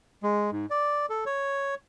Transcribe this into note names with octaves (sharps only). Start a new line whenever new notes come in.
G#3
G#2
D5
A4
C#5